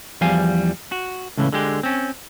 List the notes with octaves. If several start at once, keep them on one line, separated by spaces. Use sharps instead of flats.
E2 F3 G3 F5 G#5
F#4
C#2 A2 C#3 E3
D3 G#3 G4
C4 C#4